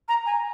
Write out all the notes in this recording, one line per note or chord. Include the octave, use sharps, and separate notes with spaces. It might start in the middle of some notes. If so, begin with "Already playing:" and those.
A#5
G#5